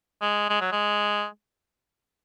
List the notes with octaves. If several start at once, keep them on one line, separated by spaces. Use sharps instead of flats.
G#3
G#3
F#3
G#3